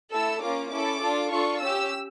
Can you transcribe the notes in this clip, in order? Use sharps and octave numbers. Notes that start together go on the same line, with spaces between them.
A3 E4 A4 E6
A#3 C#4 F4 D6
C#4 E4 A4 D6
D4 F4 A4
D4 F4 A4 C#6
C#4 G4 E6